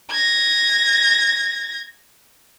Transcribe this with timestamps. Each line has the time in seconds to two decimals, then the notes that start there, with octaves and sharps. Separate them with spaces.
0.10 G#6 A#6